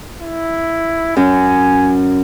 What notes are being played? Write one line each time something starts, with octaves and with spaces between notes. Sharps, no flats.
E4
F#2 G#5